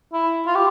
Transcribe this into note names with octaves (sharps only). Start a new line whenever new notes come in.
E4
F4
G4